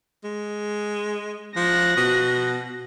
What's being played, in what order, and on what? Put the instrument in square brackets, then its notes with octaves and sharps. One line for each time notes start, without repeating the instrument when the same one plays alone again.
[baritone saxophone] G#3
[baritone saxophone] F3 [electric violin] F#6 A#6
[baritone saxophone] B2